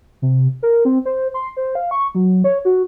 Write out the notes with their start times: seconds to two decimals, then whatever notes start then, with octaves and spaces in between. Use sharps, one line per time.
0.22 C3
0.63 A#4
0.85 C4
1.05 C5
1.34 C6
1.57 C5
1.75 F5
1.91 C#6
2.15 F#3
2.44 C#5
2.65 F#4